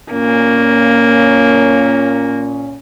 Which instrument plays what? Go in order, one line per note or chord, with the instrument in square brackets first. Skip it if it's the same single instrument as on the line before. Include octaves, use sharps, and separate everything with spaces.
[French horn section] A#2 C#4 [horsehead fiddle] A#3